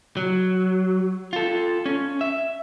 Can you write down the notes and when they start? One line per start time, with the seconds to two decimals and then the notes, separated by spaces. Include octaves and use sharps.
0.17 F#3
1.33 F4 A4
1.86 C#4
2.21 E5